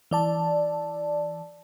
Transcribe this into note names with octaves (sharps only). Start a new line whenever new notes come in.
E3 D5 A5